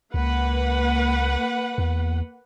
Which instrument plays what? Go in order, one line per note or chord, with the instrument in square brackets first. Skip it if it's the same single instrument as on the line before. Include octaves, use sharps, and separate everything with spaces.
[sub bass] C#2 [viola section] A#3 B4 F#5
[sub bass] E2